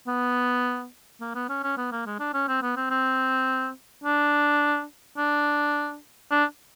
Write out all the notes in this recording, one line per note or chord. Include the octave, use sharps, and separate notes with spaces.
B3
A#3
B3
C#4
C#4
B3
A#3
G#3
D4
C#4
C4
B3
C4
C4
D4
D4
D4